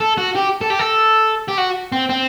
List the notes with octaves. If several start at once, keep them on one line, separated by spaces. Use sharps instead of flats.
A4
F#4
G4
A4
G4
A4
G4
F#4
C4
C4